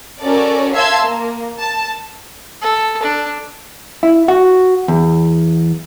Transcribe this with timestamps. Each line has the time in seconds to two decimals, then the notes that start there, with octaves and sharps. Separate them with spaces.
0.21 C#4 F#4 A4 A#4 D5
0.74 E5 F5 A5 C6 E6 G#6
1.04 A#3
1.60 A5
2.62 A4
3.03 D4
4.03 E4
4.28 F#4
4.88 E2